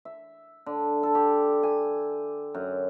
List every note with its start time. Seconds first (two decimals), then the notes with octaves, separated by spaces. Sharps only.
0.05 E5
0.66 D3
1.03 A4
1.15 G4
1.63 G#5
2.54 F#2